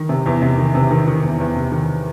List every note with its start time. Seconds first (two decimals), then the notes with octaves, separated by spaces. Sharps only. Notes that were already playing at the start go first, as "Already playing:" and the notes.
Already playing: D#3
0.09 C3
0.26 E2
0.42 C3
0.58 D#3
0.75 C3
0.91 D#3
1.07 D#3
1.23 E2
1.40 E2
1.55 C3
1.72 D#3